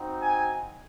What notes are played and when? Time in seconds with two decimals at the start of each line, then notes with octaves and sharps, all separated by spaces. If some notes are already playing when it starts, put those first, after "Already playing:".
Already playing: C4 D#4 F#4
0.21 G#5